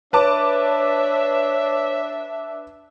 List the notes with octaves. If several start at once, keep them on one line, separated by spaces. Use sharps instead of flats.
D4 B4 C#5 E5 A5 D6